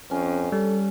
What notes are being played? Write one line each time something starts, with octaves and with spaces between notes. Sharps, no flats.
F2 C#4
G3 A4